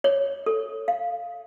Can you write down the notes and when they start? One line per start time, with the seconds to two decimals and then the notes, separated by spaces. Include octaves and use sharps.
0.04 C#5
0.46 A4
0.88 F5